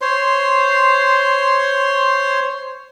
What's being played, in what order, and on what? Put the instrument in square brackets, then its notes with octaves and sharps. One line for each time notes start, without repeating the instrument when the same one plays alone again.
[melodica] C5 C#5 C6